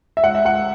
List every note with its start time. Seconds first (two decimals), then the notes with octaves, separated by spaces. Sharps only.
0.17 E5
0.23 C#2 F#5
0.35 E5
0.45 C#2 F#5